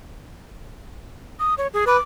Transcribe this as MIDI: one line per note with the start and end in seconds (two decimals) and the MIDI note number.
1.40 1.54 87
1.58 1.67 73
1.73 1.85 68
1.87 1.97 71
1.87 2.01 86